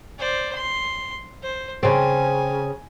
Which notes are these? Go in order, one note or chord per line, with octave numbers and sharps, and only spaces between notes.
C5 D5
C6
C5
C#3 C4 G#5